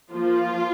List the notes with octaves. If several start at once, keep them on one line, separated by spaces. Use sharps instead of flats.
F3 A#3 F4